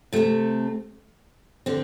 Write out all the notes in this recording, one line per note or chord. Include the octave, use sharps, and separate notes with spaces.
C3 A3 C4
D3 C4